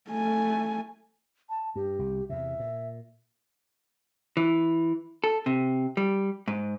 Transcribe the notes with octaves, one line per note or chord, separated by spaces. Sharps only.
A3 G#5
A5
G2 G4
C2
E2 C3 E5
A#2
E3
A4
C3
G3
G#2